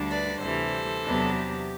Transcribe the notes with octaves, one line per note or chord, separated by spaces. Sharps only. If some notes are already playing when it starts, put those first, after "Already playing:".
Already playing: D2 D3 G3 D4
B4 D5
D2 C3 E3 G3 A4 C5
E2 C3 F#3 B3 D4
G4